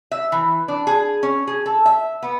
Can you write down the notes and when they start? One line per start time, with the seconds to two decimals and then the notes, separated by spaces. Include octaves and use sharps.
0.11 E5
0.32 E3
0.68 D4
0.87 G#4
1.23 C#4
1.47 G#4
1.66 A4
1.86 E5
2.22 B3